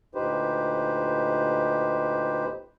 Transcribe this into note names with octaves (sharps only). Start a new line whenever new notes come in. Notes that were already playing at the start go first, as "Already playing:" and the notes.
D2 A#2 D#4 G4 B4 C5